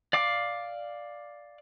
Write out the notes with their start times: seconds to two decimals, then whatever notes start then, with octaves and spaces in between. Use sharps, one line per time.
0.13 D5 F5 D6